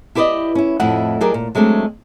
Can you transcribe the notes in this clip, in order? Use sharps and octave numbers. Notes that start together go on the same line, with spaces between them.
E4 G4 B4 C5 D5 D#5
C#4 E4
F2 A2 E4 D#5 F#5
F#3 G4 G#4 A#4 D5 D#5
A#2
F#3 G#3 A3 C4 D4